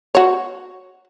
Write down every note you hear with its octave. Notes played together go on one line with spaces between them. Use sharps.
F#4 C#5